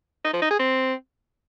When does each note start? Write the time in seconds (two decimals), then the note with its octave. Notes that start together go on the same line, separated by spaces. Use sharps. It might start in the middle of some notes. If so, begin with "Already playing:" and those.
0.25 D#4
0.33 F3
0.42 D#4
0.51 G#4
0.59 C4